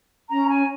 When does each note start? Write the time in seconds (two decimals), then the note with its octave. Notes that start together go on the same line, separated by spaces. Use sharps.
0.29 C#4 A#5
0.48 G#5